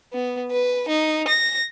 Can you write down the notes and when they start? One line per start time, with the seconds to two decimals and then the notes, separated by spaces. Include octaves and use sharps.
0.13 B3
0.51 B4
0.88 D#4
1.28 A#6